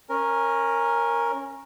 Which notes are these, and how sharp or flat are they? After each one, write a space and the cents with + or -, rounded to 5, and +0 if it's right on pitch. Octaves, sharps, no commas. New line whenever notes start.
C#4 -15 A#4 +0